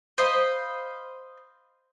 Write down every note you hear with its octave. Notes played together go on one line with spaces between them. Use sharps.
C5 D#5 F5 B5